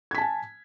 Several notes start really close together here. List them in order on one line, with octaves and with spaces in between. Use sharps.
G#6 B6 A5 G#5